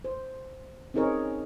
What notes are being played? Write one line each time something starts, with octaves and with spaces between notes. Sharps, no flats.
C5
C4 C#4 D#4 G#4 A#4 C#5